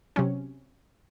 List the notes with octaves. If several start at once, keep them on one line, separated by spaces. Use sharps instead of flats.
C3 F#3 C#4